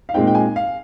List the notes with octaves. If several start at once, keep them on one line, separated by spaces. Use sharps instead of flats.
F5
A#2 G#3 C4 D#4 G5
G5
G#5
F5